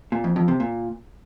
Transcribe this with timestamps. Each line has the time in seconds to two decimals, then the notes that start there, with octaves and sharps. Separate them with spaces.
0.12 A#2
0.24 F2
0.36 F2
0.48 C3
0.60 A#2